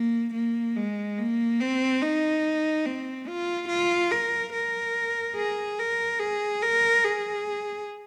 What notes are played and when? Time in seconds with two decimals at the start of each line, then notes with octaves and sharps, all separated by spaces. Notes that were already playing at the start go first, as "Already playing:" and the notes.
Already playing: A#3
0.34 A#3
0.76 G#3
1.19 A#3
1.61 C4
2.02 D#4
2.85 C4
3.28 F4
3.69 F4
4.11 A#4
4.54 A#4
5.36 G#4
5.79 A#4
6.19 G#4
6.62 A#4
7.04 G#4